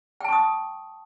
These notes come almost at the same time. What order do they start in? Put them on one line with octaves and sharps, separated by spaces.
G5 A5 C#6 D#6